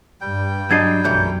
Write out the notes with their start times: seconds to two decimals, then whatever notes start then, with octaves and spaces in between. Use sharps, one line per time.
0.21 G2 G3 G5
0.70 F#3 D4 D#5 G#6 A6 C7
1.04 B1 F#2 E3 F#3 A3 G6